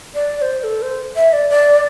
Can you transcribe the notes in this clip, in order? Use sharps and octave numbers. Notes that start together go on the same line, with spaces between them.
D5
D5
C5
C5
A4
C5
E5
D5
D5